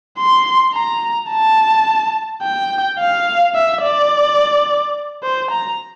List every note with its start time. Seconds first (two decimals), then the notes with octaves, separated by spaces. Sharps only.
0.18 C6
0.74 A#5
1.30 A5
2.42 G5
2.99 F5
3.55 E5
3.83 D5
5.23 C5
5.51 A#5